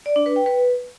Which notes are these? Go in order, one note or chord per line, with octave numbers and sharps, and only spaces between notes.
D5
D4
B4
G5
B4